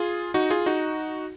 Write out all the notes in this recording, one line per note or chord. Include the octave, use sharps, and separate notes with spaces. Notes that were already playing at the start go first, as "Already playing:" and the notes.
Already playing: F4 G#4
D#4 F#4
F4 G#4
D#4 F#4